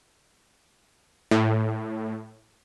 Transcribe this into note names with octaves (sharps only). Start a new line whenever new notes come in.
A2